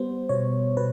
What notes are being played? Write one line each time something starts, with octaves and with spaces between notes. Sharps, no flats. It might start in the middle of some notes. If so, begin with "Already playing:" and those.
Already playing: G3 B3 C5
B2 C#5
B2 B4